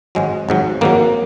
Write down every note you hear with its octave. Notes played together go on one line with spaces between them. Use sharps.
G#1 G#2 F#3 G#3
G#1 G#2 F#3
G#1 G#2 F#3 A#3